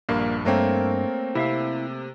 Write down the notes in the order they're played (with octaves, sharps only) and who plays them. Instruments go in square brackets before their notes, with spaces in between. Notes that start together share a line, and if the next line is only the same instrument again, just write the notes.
[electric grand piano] A#1 G2 [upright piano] A#3
[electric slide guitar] G2 [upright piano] A3 A#3 C4 [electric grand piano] A4 A#4 C#5
[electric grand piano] C3 [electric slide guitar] E4 E5 F5